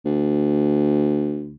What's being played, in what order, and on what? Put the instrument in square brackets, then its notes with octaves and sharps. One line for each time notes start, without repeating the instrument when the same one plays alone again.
[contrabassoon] D2